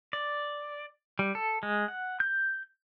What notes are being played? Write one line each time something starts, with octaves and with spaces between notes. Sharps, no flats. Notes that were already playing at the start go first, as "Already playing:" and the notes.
D5
G3
A4
G#3
F#5
G6